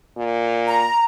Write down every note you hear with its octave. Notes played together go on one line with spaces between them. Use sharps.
A#2
A#5